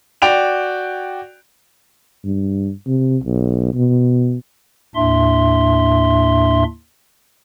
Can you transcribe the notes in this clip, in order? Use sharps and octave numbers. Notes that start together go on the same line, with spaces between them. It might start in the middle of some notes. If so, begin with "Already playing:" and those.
F#4 D5 G5 D7 F7
G2
C3
B1
B2
D#2 A2 D4 E5 C6